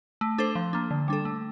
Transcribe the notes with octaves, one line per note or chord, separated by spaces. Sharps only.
A3
D4 A4 C5
F3
A#3 D4
D3
G3 D4 A4
A3